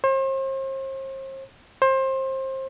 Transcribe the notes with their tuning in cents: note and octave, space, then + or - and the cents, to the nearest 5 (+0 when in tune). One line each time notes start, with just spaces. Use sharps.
C5 +40
C5 +25